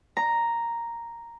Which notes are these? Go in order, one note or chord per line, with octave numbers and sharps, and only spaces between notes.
A#5